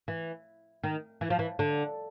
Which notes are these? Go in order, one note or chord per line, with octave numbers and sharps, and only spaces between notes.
E3
D#3
E3
F3
E3
D3